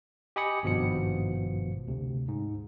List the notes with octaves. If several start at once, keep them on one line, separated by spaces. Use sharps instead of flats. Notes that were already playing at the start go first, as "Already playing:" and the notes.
G4 D#5 G#5 B5 D#6 C#7
G#1 G2 B2 F3 C#7
D2 C3
G#2